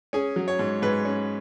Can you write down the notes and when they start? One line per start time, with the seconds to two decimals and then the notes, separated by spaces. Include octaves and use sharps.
0.13 C#4 G#4
0.36 F#3
0.48 C#5
0.59 G#2
0.82 G#2 B4
1.05 C#4